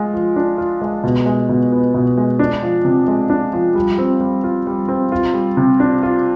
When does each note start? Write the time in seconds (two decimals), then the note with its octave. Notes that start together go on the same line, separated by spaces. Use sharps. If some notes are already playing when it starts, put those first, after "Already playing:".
Already playing: G#3 F4
0.14 F3
0.36 D4
0.58 F4
0.82 G#3
1.04 B2
1.26 G#3
1.49 B2
1.72 B3
1.94 B2
2.18 G#3
2.39 D4
2.62 F3
2.85 C3
3.08 G#3
3.30 D4
3.53 F3
3.75 G3
3.98 C4
4.21 G3
4.44 F4
4.67 G3
4.89 C4
5.12 F4
5.34 G3
5.57 C3
5.80 D4
6.03 F4